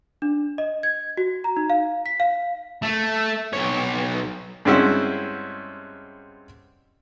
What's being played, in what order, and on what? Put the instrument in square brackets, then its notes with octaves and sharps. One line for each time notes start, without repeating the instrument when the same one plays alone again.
[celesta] D4
D#5
G#6
F#4
A#5
D#4
F5
B6
F5
[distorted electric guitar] A3
B1 C#5
[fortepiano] G2 G#3 C4 C#4 E4 F#4